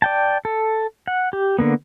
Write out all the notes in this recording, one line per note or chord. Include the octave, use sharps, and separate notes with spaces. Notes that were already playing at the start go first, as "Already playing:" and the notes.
D5 G5 A5
A4
F#5
G4
D3 A#3 B3